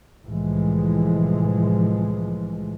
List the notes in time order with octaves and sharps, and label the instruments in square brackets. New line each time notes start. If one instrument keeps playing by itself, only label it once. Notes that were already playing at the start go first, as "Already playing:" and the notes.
[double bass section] C2 A2 E3 F3 G#3